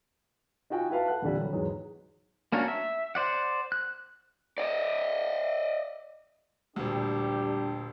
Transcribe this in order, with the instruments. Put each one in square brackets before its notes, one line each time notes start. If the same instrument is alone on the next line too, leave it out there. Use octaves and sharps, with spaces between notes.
[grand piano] D#4 F4 F#4 G5 G#5
E4 F#4 B4 F5 A5
A4 F#5 F#6
F2 A#2 D3 E3 G3
F#3
E2 G#2 F#3 G#3
[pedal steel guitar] A#3 C#4 D4 F#4 A#4
E5
C5 D5 F#5
F#6
[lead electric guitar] D5 D#5
[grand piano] D#1 D2 [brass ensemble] G3 D4 G4